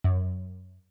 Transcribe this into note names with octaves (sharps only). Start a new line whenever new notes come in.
F#2